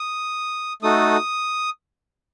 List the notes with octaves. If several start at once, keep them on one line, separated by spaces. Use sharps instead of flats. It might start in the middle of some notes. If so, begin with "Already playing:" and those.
Already playing: D#6
A3 D#4 F#4 A4 D#6